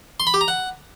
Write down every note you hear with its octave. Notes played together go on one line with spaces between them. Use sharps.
C6
B5
G4
A#5
F#5